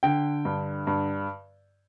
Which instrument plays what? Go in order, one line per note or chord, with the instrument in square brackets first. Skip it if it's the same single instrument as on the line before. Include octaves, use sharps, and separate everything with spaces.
[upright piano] D3 G5
G2
G2